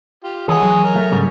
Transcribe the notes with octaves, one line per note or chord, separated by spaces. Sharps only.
F4 G4
E3 G#3 G#4 C#5 F#5 D#6
F#3
A#4 C#5
A3
G#2 C#3 G3